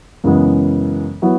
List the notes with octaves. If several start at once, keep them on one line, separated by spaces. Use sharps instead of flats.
F#2 C#3 E3 G#3 B3
F#3 B3 E4